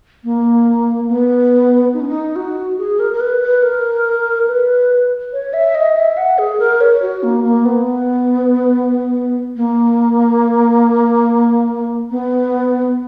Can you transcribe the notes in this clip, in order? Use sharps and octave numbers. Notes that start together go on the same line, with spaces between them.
A#3
B3
D#4
C#4
D#4
F#4
G#4
A#4
A#4
B4
B4
A#4
B4
C#5
E5
D#5
E5
F#5
G#4
A#4
C#5
F#4
A#3
A#3
B3
A#3
B3